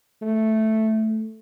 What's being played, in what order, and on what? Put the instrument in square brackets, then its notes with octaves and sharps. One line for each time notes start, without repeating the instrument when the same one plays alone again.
[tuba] A3